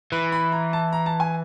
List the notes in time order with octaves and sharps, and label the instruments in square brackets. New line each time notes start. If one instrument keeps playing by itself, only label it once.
[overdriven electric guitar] E3 [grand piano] B5
[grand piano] B5
A#5
A5
A#5
A5
G#5